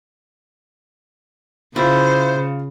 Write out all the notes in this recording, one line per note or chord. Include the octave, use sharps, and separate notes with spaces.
C#3 E4 F4 C5